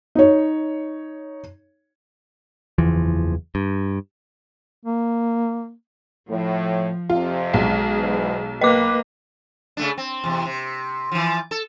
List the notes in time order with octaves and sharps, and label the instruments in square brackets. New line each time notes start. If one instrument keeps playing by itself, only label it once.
[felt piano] D#4 C#5
[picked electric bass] F#1 E2 E3 F3
G2
[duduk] A#3
[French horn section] A2 [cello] F3
[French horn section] F2 C3 [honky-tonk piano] F4
[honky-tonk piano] B1 [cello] G#3 G#4
[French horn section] E2 G#2 E3
[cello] A#3 [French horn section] B4 [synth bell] D#5 D6
[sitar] C#3 A3 D4
C4
E2 C3
C3
E3 F3
A4